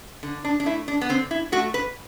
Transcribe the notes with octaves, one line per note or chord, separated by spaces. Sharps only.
D3
D4
D4
A3 E4
D4
B3
D3 C4
E4
A3 F#4
B4